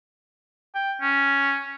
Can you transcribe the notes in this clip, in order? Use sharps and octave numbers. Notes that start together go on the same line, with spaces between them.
G5
C#4